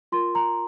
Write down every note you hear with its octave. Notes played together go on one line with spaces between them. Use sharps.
F4 A#4 C6
A#5